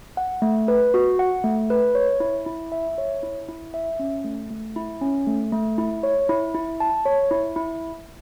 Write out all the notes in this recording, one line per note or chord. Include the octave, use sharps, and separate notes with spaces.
F#5
A3
B4
F#4
F#5
A3
B4
C#5
E4
E4
E5
C#5
E4
E4
E5
C#4
A3
A3
E4
C#4
A3
A3
E4
C#5
E4
E4
A5
C#5
E4
E4